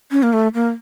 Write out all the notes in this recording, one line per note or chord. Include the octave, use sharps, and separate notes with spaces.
C#4
A#3
A3
A#3